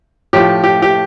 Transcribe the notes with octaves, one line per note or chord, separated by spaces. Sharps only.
A2 F3 G4
G4
G4